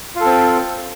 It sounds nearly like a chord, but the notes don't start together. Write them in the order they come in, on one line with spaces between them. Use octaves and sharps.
F4 A4 C4